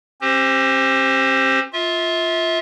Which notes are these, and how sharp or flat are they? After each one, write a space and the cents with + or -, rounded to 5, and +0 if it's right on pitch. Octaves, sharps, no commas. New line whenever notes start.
C4 +45 G4 +0 C5 +0
F4 +0 E5 -30